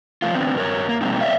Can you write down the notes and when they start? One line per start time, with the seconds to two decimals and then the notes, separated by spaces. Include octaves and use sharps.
0.22 C3 F3 A3 F4
0.34 D#3 B3 C4 D4
0.55 G2 A#4 C#5
0.89 A#3
1.01 B2 G3 A3 A#3 C4 D#4
1.21 C#5 D5 E5 F5